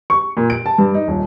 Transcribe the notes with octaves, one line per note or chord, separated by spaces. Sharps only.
C#6
A#2
D7
A5
G2
D#4
D#1